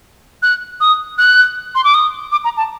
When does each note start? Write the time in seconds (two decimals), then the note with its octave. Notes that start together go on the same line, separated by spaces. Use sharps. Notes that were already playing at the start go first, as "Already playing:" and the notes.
0.42 F#6
0.80 D#6
1.18 F#6
1.75 C6
1.84 D6
1.94 D#6
2.32 D6
2.44 A#5
2.57 A5